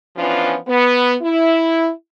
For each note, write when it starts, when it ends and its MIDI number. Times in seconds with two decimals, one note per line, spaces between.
0.16 0.55 52
0.16 0.55 53
0.16 0.55 59
0.16 0.55 61
0.16 0.55 62
0.16 0.55 65
0.68 1.14 59
1.21 1.89 64